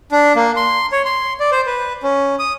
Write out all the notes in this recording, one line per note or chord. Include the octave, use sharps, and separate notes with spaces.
D4
A#3
C6
C#5
C6
D5
C5
B4
C#4
D#6